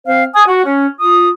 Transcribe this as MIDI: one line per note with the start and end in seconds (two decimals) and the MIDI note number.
0.07 0.24 60
0.07 0.24 72
0.07 0.24 77
0.34 0.46 80
0.34 0.46 87
0.46 0.62 66
0.65 0.86 61
0.99 1.28 65
0.99 1.28 87